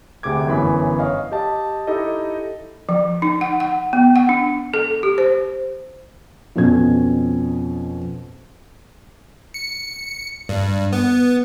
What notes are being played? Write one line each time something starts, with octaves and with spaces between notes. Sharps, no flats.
D2 C3 G#4 D6 G#6
G1 F#2 E3 C#4 B5
C#5 D#5 F5
G4 D#5 A5
D#4 E4 G4 A4 D#5
F3
D#4
F#5
F#5
B3
F#5
D4
A4
G4
C5
F2 B2 C#4 G#6
C#7
G2
B3